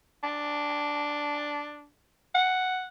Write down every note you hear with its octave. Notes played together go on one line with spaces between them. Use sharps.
D4
F#5